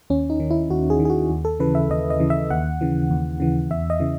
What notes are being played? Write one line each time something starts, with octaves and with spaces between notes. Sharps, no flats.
D#2 C#4
D#4
D#3
E4
D#2 F#4
G#4
D#3
G#4
F#4
D#2
A4
C#3 E3 B4
E5
D#2 D#5
D#5
C#3 E3
E5
D#2 F#5
C#3 E3
D#2
C#3 E3
E2 E5
D#5
C#3 E3